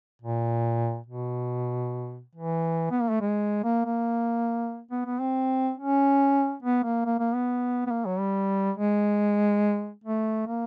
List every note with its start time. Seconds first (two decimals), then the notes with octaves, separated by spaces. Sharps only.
0.22 A#2
1.07 B2
2.36 E3
2.91 B3
3.02 A#3
3.10 A3
3.21 G#3
3.64 A#3
3.85 A#3
4.91 B3
5.06 B3
5.21 C4
5.77 C#4
6.63 B3
6.84 A#3
7.06 A#3
7.20 A#3
7.35 B3
7.87 B3
7.90 A#3
8.06 F#3
8.20 G3
8.77 G#3
10.04 A3
10.47 A#3